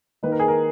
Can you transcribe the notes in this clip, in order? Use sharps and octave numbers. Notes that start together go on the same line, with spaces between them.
D#3 A#3 D#4 B4
A#4
G#4
A#4